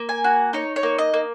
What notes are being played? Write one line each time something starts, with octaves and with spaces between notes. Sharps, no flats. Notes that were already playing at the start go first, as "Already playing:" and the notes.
Already playing: A#3
G#5
F#4
D#4 C#5
C#5
A#3
D#5
A#3